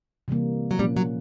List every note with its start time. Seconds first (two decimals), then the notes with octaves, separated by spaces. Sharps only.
0.28 C3 E3 G3 A#3
0.71 F#3
0.79 A#2 F3 G3 A#3 C#4
0.97 F#3